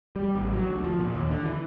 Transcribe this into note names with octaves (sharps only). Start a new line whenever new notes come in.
G3
A1
F#3
D2
F3
A#2
D#2
D3
E3